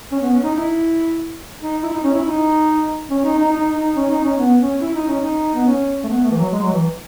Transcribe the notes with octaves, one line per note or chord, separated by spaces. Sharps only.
C#4
B3
C#4
D#4
E4
D#4
E4
D#4
C#4
E4
D#4
C#4
D#4
D#4
D#4
D#4
C#4
D#4
C#4
B3
C#4
E4
D#4
C#4
D#4
B3
C#4
A3
B3
A3
E3
F#3
G#3
F#3
E3